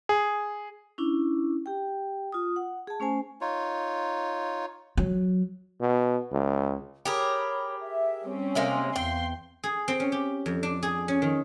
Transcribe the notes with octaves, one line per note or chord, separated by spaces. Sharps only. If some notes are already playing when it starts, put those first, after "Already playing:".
G#4
C#4 D4 E4
G4 G5
F4 D#6
F#5
G#4 A5
A3 C#4 C5 G#5
D#4 F4 C#5
F#3
B2
C#2
G4 G#4 A#4 C#5 B5
E5
G3 C4 C#4
C3 G#3 A#3 D#5 G#5 C6
E2 F5 G5 C6
G#4
C4
C#4
G4
F2
D4
G#4
C#4
D#3